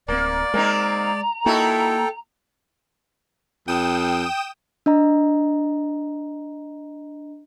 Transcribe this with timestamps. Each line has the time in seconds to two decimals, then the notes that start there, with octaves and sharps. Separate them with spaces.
0.08 D1 A#3 C4 D5
0.54 G#3 A#3 C4 D#4 A#5
1.46 A#3 D#4 E4 F#4 A4 G5
3.68 F2 G5 D#6 E7
4.86 D4 D#5 A#5